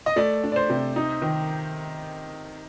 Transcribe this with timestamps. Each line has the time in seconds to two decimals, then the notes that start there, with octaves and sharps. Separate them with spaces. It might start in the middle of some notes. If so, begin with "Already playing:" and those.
0.06 D#5
0.16 A3 D5
0.44 D4
0.52 D5
0.56 C5
0.70 C3
0.96 D#4
1.22 D#3